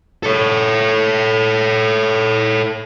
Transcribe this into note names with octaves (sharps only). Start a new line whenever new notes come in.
A4 C#5